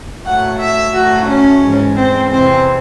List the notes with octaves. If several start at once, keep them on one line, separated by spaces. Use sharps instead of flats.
A2 F#3 A3 F#5
E5
A2 F#3 A3 F#4
C#4
G#2 E3 G#3
C4
E2 C3 E3 G#3 C4